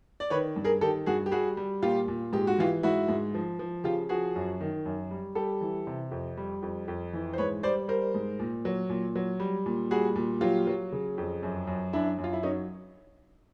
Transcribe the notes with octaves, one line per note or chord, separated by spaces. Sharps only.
D5
D#3 B4 C#5
G2
G#4 A#4
D#3 G4 A4
G2 F#4 G#4
G4
G3 F#4 G#4
G3
A#2 F4 G4
A#2
G#2 G4
F#4
E3 F4 G4
G#2 E4 F#4
G#2
F3
F3
C#3 F4 G4
F3 F#4 G#4
F#2
D#3
F#2
G3
G3 G4 A4
E3
C3
F2
G3
F2
F2
E3
C5
G#2 B4 C#5
G3 C5 D5
G3 A#4 C5
G#2
A#2
F#3
A#2
F#3
G3
A#2
G3 F#4 G#4
A#2
F#3 F4 G4
F#3
C#3
F2
F#2
F#2
F#2 D4 E4
F#2
F4
E4
F#3 C#4 D#4